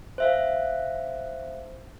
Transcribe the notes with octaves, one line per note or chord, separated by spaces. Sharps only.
C5 E5 F5